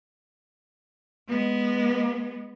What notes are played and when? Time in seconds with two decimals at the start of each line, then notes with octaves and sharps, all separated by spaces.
1.29 G#3 B3